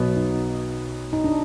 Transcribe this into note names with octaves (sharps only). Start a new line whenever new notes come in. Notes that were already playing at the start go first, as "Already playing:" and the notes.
Already playing: B1 B2 F#3 B3
D#4
D#4
D4